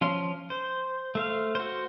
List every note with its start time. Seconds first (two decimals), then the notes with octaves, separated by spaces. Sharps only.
0.01 F3 C#4 F5 C6
0.50 C5
1.15 A3 C5 F5
1.55 F#4 C5